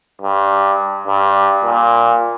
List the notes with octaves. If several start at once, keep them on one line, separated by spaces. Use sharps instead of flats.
G2
G2
A#2